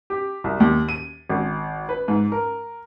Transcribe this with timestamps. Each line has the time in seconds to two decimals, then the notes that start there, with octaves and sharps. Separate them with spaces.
0.10 G4
0.44 C2
0.60 D#2
0.89 D#7
1.29 G#1
1.89 B4
2.08 G#2
2.32 A#4